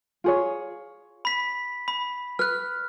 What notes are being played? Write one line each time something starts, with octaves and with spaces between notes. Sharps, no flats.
F4 G#4 C#5
B5 B6
B5
B4 F6 F#6